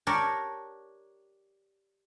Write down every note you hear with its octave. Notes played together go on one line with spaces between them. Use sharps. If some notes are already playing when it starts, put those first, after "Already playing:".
D4 G4 A#4 C#5 D5